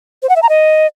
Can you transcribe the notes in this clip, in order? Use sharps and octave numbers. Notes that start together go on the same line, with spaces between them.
C5
F#5
E5
A#5
D#5